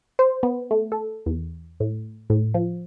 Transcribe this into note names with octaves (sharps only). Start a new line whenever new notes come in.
C5
B3
A3
A4
E2
A2
A2
F3